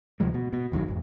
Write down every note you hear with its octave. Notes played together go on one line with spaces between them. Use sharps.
D2 C3 F3 G#3
B2
B2
G1 E2 D#3 F#3
A1 F2